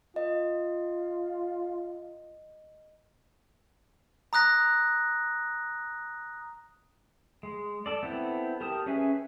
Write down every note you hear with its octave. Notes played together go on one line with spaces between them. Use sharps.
F4 D#5
A#5 D#6 F#6 A#6
G#3
A4 D5
B3 C4 E4 A4
G4 A#4 A5 D#6
C#4 G#4 B4 E5 G#5